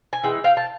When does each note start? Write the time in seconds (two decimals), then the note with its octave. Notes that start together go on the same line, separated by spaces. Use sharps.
0.13 G#5
0.24 E3 G#3 G5
0.44 F5 G5
0.57 A5